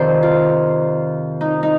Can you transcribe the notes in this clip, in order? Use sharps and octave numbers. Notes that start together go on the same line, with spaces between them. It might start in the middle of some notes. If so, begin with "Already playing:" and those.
Already playing: F2 C3 D#3 C5 D5
F4
D#4
D#4